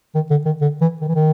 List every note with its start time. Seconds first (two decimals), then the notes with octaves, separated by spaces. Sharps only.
0.15 D#3
0.30 D3
0.45 D#3
0.61 D3
0.81 E3
1.01 D#3
1.08 E3
1.15 D#3